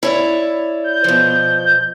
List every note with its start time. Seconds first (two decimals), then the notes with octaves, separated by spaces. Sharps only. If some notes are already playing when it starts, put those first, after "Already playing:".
0.03 E4 C#5 D5
0.84 G6
1.04 B2 F3